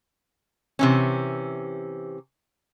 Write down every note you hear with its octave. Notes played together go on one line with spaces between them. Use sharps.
C3 E3 C#4